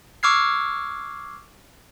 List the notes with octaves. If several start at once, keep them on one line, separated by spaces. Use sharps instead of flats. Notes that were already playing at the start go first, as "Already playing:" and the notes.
C#6 D6 E6 F6 G#6 C7